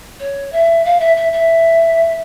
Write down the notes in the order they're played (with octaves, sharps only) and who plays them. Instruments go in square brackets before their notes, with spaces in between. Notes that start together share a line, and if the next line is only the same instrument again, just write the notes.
[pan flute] C#5
E5
F5
E5
E5
E5